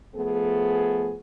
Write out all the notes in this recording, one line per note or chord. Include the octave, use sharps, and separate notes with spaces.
F3 A3 B3 G#4